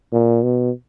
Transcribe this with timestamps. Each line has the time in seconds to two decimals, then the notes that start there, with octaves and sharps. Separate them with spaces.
0.12 A#2
0.43 B2